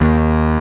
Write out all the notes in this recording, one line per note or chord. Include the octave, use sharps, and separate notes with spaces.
D#2